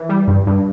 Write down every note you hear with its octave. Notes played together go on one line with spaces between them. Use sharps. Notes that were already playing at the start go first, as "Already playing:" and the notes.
Already playing: E3
G3
G2
G2